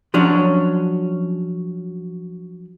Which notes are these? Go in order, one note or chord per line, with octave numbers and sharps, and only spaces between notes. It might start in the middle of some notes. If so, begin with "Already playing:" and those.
F3 F#3 C#4 D4